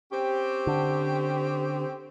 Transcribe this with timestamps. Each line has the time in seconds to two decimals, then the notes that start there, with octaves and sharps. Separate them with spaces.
0.12 C4 C#4 G4
0.67 D3